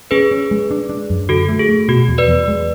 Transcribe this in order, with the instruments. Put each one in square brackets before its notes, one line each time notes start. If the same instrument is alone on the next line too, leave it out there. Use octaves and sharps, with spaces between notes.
[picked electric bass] C#4 [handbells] G#4 B4
[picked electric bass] C#4
G#3
D4
D4
F#2
[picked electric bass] D3 [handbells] F#4 A4
[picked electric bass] A3
[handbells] G#4
[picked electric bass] A3
[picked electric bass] B2 [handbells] F#4
[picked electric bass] E2
[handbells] B4 D5
[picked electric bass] E2
G#3